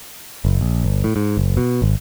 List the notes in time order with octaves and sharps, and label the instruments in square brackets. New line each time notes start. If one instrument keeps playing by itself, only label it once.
[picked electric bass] F#1
A#1
G1
A2
G#2
F#1
B2
G#1